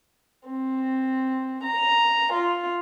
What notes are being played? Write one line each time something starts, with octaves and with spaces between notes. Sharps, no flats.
C4
A#5
F4